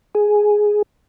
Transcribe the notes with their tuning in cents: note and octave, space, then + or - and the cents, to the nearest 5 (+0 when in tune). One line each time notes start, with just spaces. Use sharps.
G#4 +5